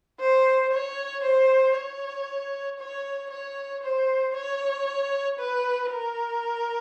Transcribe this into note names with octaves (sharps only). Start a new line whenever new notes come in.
C5
C#5
C5
C#5
C#5
C#5
C5
C#5
B4
A#4